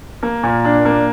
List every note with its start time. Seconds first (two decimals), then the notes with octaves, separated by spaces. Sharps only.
0.23 A#3
0.43 A#2
0.65 D4
0.85 A#3